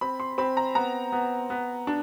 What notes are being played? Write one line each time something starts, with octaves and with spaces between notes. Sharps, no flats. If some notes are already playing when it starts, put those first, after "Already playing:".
C4 B5
C6
C4 B5
A#5
B3 A#5
B3
B3
D4